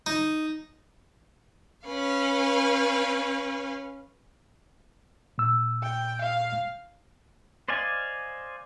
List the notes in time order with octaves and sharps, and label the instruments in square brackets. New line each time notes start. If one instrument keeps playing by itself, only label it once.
[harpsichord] D#4
[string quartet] C#4 B4 F5
[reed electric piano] A#2 E6
[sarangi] G5
F5
[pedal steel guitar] C5 D5 D#5 F5 G#5